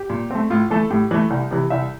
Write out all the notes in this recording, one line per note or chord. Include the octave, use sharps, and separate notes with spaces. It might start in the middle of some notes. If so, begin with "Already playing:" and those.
Already playing: G4
A#2
A3 C4
A2 F4
E3 A3 A4
A2 G4
E3 A3
C2
C3 E3
C2 E5